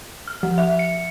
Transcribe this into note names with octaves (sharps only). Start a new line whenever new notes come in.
F6
F3
E5
C#7